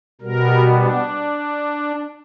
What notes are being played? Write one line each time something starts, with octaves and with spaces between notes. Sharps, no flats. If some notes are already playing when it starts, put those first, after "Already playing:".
B2 G3 B3 A#4
D4